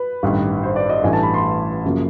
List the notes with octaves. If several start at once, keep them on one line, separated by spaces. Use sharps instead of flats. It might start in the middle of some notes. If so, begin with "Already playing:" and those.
Already playing: B4
A1 G2 D#3
C5
D5
D#5
A1 G2 E3 A3 G#5
A5
B5
C6
F#2 C#3 F3 A#3